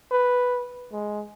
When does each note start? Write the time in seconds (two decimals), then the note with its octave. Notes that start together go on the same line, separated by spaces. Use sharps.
0.11 B4
0.92 G#3